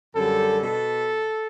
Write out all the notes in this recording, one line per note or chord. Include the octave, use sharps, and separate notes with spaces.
F#2 D3 G3 A4
B2 A4